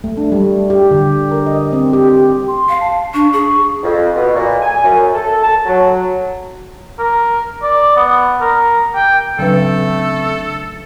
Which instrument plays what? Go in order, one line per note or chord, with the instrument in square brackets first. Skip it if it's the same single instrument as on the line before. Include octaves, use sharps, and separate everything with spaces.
[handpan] A3
D4
G3
G4
D3
A#4
D#5
C4
G4
G4
[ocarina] C6
[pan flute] F5
[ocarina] A5
[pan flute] D4 [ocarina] C#6
[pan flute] G#4
[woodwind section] F2
B2
A#2
G#5
F#2
A4
A5
F#3
[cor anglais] A#4
D5
B3
A#4
G5
[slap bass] C#3 C4 D4 [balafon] F#3 B4 [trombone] A3 [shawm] A4